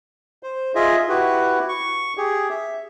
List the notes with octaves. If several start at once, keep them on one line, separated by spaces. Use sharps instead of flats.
C5
F4 G#4 D#5 E5
E4 F#4 G4 B4
C#6
G4 G#4
E5